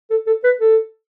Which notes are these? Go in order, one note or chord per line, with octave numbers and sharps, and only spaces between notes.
A4
A4
B4
A4